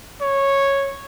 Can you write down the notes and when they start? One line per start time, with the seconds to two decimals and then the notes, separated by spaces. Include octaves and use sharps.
0.21 C#5